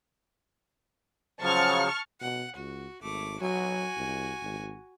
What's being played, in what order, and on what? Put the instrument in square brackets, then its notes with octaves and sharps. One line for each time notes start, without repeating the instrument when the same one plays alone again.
[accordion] C#3 F3 F#3 [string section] A5 C#6 F6
[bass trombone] B2 [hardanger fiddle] F#5
[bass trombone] C#2 [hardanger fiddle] F#4
[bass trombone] G#1 [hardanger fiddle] A3 D6
[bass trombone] F#3 [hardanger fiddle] F#4 G#5
[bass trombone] C2
G#1